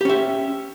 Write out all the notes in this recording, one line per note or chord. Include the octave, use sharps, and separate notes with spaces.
C#4 G4 E5